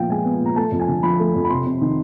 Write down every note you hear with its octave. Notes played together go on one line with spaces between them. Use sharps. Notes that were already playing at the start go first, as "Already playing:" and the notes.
Already playing: A#2 F3 B3 F5 G5
G#3 G#5
B3
A#2 A#5
A3 A5
F2
G#5
D3
F3 B5
A3
F2
B5
C3 C6
C3
D#3